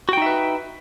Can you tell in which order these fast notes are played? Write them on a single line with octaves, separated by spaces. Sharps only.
F#4 G5 D#4 E5 B4